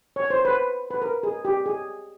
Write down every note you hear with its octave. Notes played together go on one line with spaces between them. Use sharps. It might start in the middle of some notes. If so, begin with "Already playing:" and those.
C#5
C5
B4
B4
A#4
G#4
G4
G#4